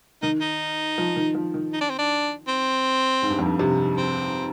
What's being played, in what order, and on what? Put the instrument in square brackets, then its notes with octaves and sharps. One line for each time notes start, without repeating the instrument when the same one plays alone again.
[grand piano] D#3 [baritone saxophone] D#4
[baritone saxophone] D#4
[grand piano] F3
D#3
F3
D#3
[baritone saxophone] D#4
D4
C4
D4
C4
[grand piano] G#2
G2
F2
G2
C3
[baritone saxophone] C4